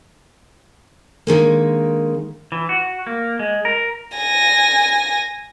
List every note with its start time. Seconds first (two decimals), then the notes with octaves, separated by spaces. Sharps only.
1.27 D3 D#3 G#3 A#3
2.52 E3
2.69 F#4
3.07 A#3
3.39 G#3
3.65 A#4
4.17 G#5 A#6